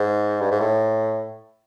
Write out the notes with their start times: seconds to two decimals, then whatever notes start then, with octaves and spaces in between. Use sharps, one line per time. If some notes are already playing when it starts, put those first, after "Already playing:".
Already playing: G#2
0.41 G2
0.51 G#2
0.60 A2